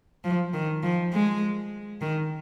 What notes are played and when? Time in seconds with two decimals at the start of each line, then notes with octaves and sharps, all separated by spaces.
0.24 F3
0.54 D#3
0.83 F3
1.13 G#3
2.01 D#3